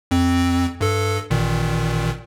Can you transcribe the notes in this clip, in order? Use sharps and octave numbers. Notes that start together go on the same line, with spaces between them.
F2 C4
G2 A4
A1 A#2 D#3